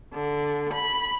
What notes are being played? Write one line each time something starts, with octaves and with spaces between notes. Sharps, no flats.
D3
B5